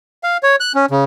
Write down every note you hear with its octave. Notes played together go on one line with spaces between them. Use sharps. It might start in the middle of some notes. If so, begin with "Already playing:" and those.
F5
C#5
F#6
C#4
C#3